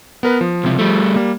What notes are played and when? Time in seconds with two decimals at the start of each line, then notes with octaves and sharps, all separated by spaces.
0.23 B3 A#4 B4
0.41 F3
0.64 C#2 C3
0.79 G3 A3
1.16 G3 A#3